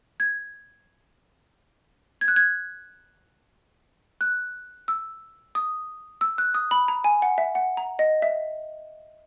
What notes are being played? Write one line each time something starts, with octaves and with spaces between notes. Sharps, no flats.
G#6
G#6
F#6
G#6
F#6
E6
D#6
E6
F#6
D#6
B5
A#5
G#5
F#5
E5
F#5
A#5
D#5
E5